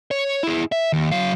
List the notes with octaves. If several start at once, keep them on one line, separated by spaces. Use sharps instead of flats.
C#5
E4 G#4
E5
D#2
F#3 F5